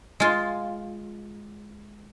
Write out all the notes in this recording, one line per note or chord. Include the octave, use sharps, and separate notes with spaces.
G#3 F4